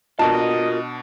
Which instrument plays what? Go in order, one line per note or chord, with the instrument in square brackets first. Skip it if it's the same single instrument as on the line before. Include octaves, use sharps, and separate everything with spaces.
[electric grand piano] B2 D4 [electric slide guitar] F4 F#4 A#4 [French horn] D#5 [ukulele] A5